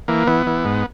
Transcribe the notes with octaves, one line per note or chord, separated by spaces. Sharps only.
E3 A#3
E3 B3
E3
G#2